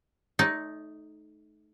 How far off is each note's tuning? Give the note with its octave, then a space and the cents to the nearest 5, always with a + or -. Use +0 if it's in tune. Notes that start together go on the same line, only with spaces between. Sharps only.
A3 -30 D#4 +0 D5 -40